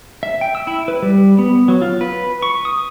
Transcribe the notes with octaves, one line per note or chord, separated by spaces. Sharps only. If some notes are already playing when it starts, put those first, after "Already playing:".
E5
G5
E6
E4
B4
G3
B3
F#3
F4
B4
C#6
D#6